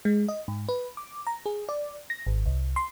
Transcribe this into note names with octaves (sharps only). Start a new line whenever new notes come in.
G#3
D#5
G#2
B4
D6
A#5
G#4
D5
A#6
G#1
C2
C6